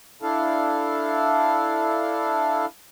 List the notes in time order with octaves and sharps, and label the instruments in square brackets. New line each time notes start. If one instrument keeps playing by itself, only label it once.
[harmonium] D4 E4 A4 F5